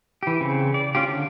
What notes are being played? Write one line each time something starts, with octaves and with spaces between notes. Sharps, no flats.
E3 G4
C#3 C4
D5
C#4 F4 G4
D3